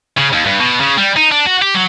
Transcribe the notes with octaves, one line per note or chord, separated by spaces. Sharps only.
C#3
D#2
G2
B2
C#3
G3
D#4
D4
F#4
G4
F#3